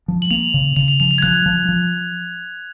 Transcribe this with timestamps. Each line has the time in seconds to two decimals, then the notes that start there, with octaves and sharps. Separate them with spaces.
0.08 F3
0.22 F#7
0.31 A#3 F7
0.54 C#3
0.76 C#3 F7
0.88 F7
1.00 F3 F7
1.11 F7
1.18 G#6
1.22 F3 F#6
1.46 F3
1.69 F3